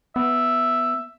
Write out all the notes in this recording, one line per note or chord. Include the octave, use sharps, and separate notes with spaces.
B3 E5